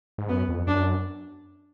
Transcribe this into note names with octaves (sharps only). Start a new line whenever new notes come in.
G#2
F#2 B3
F2
F#2 D4